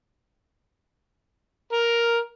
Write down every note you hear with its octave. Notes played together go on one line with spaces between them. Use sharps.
A#4